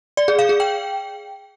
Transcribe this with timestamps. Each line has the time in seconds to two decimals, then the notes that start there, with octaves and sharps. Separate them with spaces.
0.17 D5
0.28 G#4
0.39 F5
0.49 G#4
0.60 G5